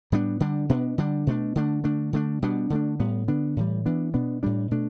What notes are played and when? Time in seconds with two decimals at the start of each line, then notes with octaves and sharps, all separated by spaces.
0.12 A2 G3 B3 D4
0.40 D3 G3 D4
0.70 B2 B3 D4
0.98 D3 G3 D4
1.27 B2 A3 D4
1.56 D3 A3 D4
1.84 D3 A3 D4
2.13 D3 A3 D4
2.42 B2 G3 B3 D4
2.70 D3 A3 D4
3.00 A2 G3 B3
3.28 D3 B3 D4
3.57 A2 E3 G3
3.86 E3 B3 D4
4.14 B2 B3 D4
4.43 A2 G3 D4
4.71 B2 A3 D4